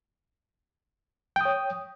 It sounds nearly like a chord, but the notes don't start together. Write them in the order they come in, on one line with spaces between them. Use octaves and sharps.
G5 D#6 C#5